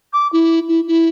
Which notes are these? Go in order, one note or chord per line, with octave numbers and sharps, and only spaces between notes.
D6
E4
E4
E4